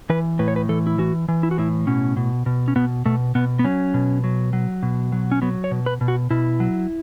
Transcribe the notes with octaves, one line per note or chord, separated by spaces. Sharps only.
E3 B4
A2 B4
C#5
B4
E3 A4
E4
E3 F#4
E3
E4
F#4
A2 E4
B2 C#4
B2
B2
C#4
B2 B3
B2 A3
B2 B3
B3
F#3 C#4
B2
F#3
F#3
B2
F#3
C#4
F#3 B3
C#5
B2
B4
B2
F#4
B2 E4
F#3